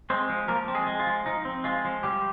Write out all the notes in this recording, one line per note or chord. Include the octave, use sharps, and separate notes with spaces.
G#3 C4 C5
F3
F3 A#3 A#4
C4
G#3 G#4
G#3
F4
F3
F3 D#4
C4
G#3 F4
F3
F3 G3 G4